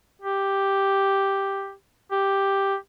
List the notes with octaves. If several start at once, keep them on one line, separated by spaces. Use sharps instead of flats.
G4
G4